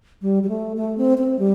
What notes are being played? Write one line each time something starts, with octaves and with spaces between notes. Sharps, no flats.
G3
G3
A3
A3
C4
C4
G3